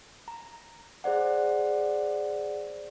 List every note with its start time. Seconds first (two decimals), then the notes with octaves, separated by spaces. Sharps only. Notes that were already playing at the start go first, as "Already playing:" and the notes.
0.28 A#5
1.04 G#4 C5 D5 F#5